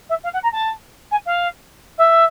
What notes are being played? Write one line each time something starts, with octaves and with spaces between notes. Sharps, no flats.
E5
F5
F#5
A#5
A5
G#5
F5
E5